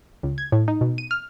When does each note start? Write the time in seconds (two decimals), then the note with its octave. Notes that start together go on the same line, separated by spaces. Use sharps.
0.23 C#2
0.38 G#6
0.52 A2
0.68 D#4
0.81 B2
0.98 D#7
1.11 F6